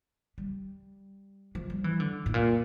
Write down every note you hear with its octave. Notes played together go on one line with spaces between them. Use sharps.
G3
F3
G3
E3
D3
A2
A#2